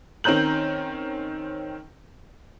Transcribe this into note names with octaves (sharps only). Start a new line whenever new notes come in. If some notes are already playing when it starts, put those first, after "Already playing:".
D#3 C4 C#4 A#5 G6 F#7